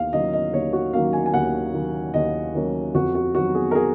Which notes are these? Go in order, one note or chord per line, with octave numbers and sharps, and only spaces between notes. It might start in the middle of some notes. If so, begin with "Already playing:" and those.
Already playing: D#2 F5
D#3 F#3 A#3 C#4 D#5
D#5
D#2 C#5
F#4
D#3 F#3 A#3 C#4 F5
G#5
G#5
D#2 F#5
D#3 F#3 A#3 C#4
D#2 D#5
D#3 F#3 A#3 C#4
F2 F#4
F#4
D#3 F#3 B3 F#4
G#4
A#4
G#4